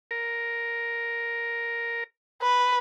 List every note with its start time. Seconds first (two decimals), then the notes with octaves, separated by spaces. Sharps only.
0.11 A#4
2.42 B4